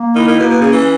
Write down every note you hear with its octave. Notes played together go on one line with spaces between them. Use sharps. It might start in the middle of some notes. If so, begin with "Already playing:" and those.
Already playing: A#3
D#3 E4
D#3
B2 A#3
B2
C#3 C#4
E3